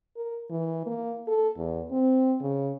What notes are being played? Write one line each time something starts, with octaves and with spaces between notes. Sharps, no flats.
A#4
E3
A#3
A4
E2
C4
C#3